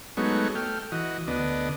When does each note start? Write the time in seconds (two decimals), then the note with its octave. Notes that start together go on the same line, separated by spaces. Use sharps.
0.17 F#3 G#3 A3 B3 D#4 C#5
0.55 A3 G5 F6
0.92 E3 F#4 D#5
1.28 D2 B3 D4 D#5